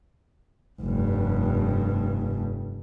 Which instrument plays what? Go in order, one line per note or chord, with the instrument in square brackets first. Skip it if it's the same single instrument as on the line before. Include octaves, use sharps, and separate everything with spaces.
[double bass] F1 G2